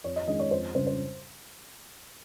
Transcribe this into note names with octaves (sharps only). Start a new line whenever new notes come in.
F2 C#5
D#5
D#3 G#3 C#4 D#5
C#5
F2 C5
C#3 G3 C#4 C5
C5